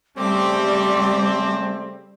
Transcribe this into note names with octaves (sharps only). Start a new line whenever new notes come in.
C#3 G3 A3 C4 D6